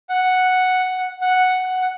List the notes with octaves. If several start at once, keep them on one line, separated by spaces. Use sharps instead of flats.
F#5
F#5